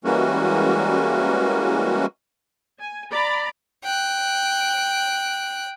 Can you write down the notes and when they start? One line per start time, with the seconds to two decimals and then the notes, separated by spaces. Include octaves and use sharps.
0.04 E3 G3 G#3 A#3 C#4 F#4
2.79 G#5
3.10 D5 A#5 B5
3.84 G5 F#6